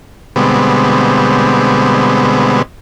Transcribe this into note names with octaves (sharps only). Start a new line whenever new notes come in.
B2 D3 G3 G#3 B3 C4